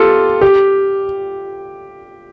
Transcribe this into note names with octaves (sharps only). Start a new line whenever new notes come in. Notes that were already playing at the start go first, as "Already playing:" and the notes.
Already playing: F4 G4 A4
G4